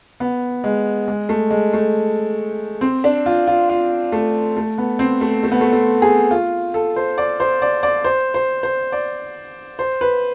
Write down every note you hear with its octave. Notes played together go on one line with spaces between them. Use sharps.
B3
G#3
G#3
A3
G#3
A3
C4
D4
F4
F4
F4
A3
A3
B3
C4
A3
A3
B3
A3
A3
G#4
F4
A4
C5
D5
C5
D5
D5
C5
C5
C5
D5
C5
B4